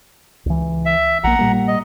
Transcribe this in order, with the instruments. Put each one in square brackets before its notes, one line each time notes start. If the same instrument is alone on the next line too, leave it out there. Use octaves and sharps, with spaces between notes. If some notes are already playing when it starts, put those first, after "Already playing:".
[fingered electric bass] C#2 E3
[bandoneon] E5
[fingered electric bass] A#1 A#3 [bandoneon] F#5 A#5
[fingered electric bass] A#2 G3 A#3
[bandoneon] D#5